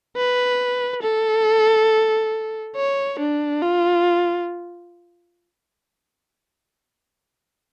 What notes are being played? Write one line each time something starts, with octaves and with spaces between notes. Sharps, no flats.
B4
A4
C#5
D4
F4